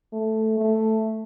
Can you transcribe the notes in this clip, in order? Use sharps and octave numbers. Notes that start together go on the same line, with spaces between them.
A3
A3